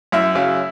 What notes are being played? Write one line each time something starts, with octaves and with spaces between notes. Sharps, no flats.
F#2 E4 E5
C#3 F#3